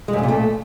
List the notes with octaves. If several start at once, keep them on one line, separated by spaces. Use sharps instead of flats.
G#3
F#2
C#3
A#2
A3